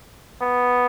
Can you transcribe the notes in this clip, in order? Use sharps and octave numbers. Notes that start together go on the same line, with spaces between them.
B3